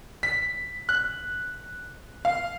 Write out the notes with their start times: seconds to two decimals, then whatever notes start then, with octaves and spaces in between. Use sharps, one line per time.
0.23 B6
0.89 F#6
2.25 F5